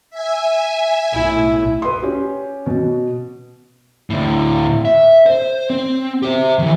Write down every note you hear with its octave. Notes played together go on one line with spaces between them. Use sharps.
E5 G#5
B1 A2 E4
B4 C6
C#4 G4
B2
D2 A2
E5
C5
C4
G4 C5
D#3 E3